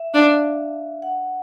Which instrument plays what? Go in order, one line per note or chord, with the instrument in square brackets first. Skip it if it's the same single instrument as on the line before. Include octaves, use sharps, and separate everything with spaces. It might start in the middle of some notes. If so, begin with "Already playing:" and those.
Already playing: [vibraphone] E5
[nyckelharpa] D4 [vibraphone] F5
[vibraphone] F#5